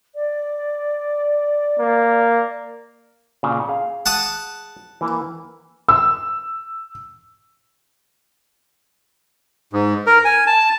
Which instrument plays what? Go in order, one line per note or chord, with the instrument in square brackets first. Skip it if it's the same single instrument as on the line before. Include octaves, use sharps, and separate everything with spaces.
[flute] D5
[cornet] A#3
[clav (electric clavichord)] A#2 C#3
G#4 F5
[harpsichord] F#5 A5 D#6
[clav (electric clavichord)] E3 A#3
[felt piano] E6
[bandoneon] G#2
A#4
G#5
A5